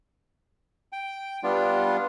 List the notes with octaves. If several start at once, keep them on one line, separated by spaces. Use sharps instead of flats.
G5
G3 B3 D4 F4